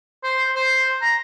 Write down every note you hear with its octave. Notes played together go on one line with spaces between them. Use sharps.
C5
C5
A#5